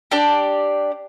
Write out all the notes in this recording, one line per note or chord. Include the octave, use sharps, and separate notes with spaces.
D4 G4 D5